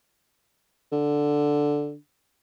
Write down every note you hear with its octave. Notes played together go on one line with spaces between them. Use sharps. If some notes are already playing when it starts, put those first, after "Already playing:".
D3